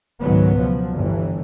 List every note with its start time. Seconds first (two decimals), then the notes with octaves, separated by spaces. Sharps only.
0.21 C#2 G#2 D#3 F#3 B3
0.60 B2 F3 F#3
0.94 G1 G2 E3